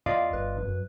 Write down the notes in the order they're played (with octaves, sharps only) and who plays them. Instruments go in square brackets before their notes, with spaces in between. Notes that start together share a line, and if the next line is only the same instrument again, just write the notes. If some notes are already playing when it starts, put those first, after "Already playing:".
[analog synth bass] E2 [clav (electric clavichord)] F4 D5 D#5 [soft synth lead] F5
[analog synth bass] G1 [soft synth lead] B4
[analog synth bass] F#2